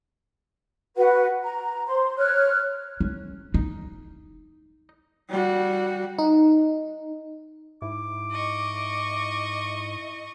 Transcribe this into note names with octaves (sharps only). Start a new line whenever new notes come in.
F#4 B4 F#5
A#5
C5 C6
C#5 F6 F#6
C#4
D#4
G3 F#4
D#4
G#2 E4 D6
D#5 C#6